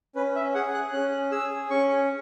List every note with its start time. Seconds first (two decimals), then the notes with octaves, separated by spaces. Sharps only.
0.15 C#4 B4
0.35 E5
0.54 G#4 F#5
0.74 F#6
0.93 C#4 F#6
1.32 G#4 E6
1.70 C#4 C#6